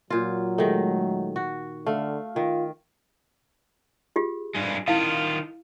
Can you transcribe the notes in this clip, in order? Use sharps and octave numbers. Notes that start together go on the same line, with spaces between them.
A#2 F#3 F4
D#3 G#3 A3 D#4
F#4
D3 A3 F5
D#3 F4
F4 G4 G#4
G2 G#3
D#3 E4 F4 F5